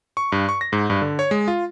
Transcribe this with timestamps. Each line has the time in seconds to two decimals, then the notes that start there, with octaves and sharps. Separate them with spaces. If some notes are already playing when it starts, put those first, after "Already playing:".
0.17 C#6
0.32 G2
0.49 C#6
0.61 A#6
0.73 G#2
0.90 G2
1.02 D3
1.19 C#5
1.31 G#3
1.48 F4